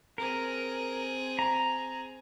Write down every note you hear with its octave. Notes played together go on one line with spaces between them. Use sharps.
C4 G#4 A#4
A#5